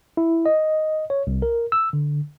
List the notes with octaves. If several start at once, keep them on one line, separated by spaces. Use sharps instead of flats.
E4
D#5
C#5
C2
A#4
E6
D3